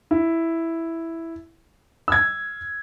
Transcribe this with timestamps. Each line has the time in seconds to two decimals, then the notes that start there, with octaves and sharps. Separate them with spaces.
0.11 E4
2.08 E6 G#6